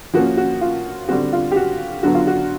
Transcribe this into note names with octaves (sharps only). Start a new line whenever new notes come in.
F3 A#3 C#4 F#4
F#4
F4
D3 G3 C4 F#4
F4
G4
F#4
D3 F#3 B3 D4 F#4
F4
F#4